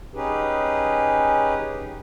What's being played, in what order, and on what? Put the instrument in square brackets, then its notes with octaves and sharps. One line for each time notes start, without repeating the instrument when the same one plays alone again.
[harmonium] C#4 D#4 G4 G#4 B4